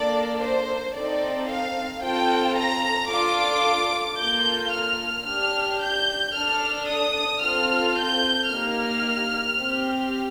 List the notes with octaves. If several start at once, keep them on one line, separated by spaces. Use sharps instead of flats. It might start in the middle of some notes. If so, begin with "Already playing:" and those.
Already playing: A#3 D4 A4 D5
C5
C4 D#4 A4 D5
F5
C4 F4 A4 G5
A#5
D4 F4 A4 D6
A#3 F4 A4 G6
F6
D4 G4 F6
G6
D4 A4 F6
D#6
C4 F4 A4 F6
G6
A#3 D#4 G4 F6
C4 G4